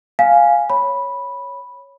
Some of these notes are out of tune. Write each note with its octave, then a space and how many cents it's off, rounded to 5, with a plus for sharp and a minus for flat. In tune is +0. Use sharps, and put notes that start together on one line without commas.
F5 +0 G#5 +0
C#5 +0 B5 -10